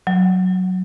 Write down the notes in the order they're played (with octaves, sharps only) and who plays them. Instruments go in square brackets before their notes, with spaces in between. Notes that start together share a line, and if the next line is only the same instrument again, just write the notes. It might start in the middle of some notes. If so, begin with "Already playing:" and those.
[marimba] F#3